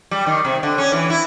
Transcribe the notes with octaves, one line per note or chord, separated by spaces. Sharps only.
G3
D#3
C3
D3
C#4
E3
E4